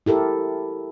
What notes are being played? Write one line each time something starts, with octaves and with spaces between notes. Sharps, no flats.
E4 G4 A4 A#4